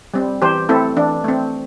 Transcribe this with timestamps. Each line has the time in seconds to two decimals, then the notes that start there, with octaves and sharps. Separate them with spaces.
0.14 G3 C4
0.42 E3 G4 C5
0.69 A3 C4 E4 A4
0.97 E3 D4
1.24 A3 C4